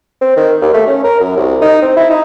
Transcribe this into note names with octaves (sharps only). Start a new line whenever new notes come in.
C4
D#3
D#2
A3
C#4
A#4
F#2
C2
D#4
C4
E4
D#4